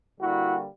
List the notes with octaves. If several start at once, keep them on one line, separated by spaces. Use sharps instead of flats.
D3 G3 A#3 E4 F#4